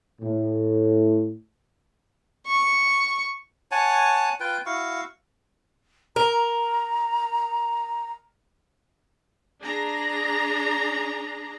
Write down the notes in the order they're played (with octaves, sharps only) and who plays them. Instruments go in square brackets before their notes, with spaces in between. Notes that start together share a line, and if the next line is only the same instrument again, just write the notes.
[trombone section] A2
[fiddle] C#6
[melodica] C#5 F#5 G#5 A5
F4 B4 G5
E4 F#4 F5 C#6
[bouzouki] A#4 [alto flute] A#5
[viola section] D4 G#4 A#5